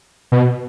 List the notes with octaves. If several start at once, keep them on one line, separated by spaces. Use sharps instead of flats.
B2